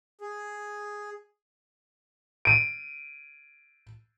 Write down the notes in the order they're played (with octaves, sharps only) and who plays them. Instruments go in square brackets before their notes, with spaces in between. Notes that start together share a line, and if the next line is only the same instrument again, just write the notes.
[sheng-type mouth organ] G#4
[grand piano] D7 D#7